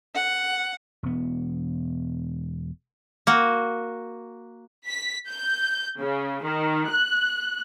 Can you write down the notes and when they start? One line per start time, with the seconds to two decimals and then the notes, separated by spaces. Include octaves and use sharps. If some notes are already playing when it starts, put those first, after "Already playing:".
0.14 F#5
1.03 E1 B3
3.27 A#3 F#4
4.88 B6
5.28 G6
6.00 C#3
6.44 D#3
6.90 F#6